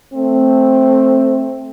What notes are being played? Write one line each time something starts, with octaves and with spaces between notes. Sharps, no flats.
A3 C4